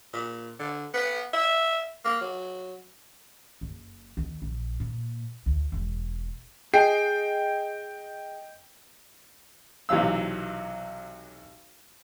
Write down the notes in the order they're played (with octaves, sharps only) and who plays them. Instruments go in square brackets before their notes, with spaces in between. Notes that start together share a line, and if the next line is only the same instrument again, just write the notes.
[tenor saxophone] A#2
D3
B3
E5
A#3
F#3
[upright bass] F#1
D#2
A#1
A#2
D2
E1
[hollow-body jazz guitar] G#4 [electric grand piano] D#5 G5 C7
[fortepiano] B1 C3 E3 F#3 F5 E6